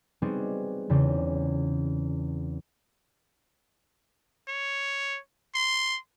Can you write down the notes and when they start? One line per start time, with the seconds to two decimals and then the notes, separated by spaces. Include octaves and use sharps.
0.22 G3 B3 C4 D#4 F#4 G#4
0.89 E2 C#3 G3 C4
4.48 C#5
5.55 C6